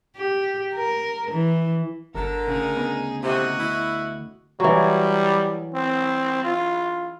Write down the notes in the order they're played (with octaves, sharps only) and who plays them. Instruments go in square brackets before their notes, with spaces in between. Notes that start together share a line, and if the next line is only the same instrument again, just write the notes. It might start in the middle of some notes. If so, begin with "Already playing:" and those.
[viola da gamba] G4
A#4
E3
[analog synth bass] G1 [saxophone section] D3 A#4 [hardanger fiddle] A4
[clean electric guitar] D2 C#3 [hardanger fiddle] D#4 G#4
[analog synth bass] B3
[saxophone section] A2 C3 [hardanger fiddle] F#4 D#5
[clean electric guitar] D2 [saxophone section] E4
[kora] E3 F#3 [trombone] G3
[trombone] C4
F4